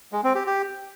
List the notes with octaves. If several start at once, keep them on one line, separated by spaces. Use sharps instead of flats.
G#3
C4
G4
G4